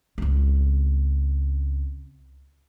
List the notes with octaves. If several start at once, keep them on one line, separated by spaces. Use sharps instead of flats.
C#2 C4